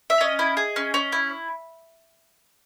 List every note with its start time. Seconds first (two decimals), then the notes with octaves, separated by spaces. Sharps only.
0.10 E5
0.21 C#4 D#5
0.39 E4
0.57 G#4
0.76 C#4
0.94 C#4
1.12 E4